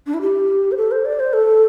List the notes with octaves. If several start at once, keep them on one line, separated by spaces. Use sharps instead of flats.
D4
E4
G4
C5
A4
C5
D5
C5
A4